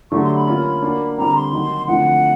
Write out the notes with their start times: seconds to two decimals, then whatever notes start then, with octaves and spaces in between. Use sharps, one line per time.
0.11 D3 F#3 A3 D4 G4 C#6
0.24 C6
0.35 B5
0.47 A#3 C#4 F4
0.83 A#3 D4 F#4
1.17 D3 G3 C4 A#5
1.36 C6
1.52 D#3 F#3 A#3 D#4 F#4
1.87 D3 F3 A3 C4 E4 F#5